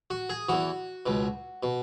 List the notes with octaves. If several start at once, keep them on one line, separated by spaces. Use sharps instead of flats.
F#4
G#4
E2 E3 F#4
C#2 B2
B2